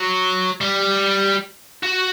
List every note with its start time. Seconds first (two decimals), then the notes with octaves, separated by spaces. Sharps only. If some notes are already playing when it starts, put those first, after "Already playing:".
Already playing: F#3
0.61 G3
1.83 F#4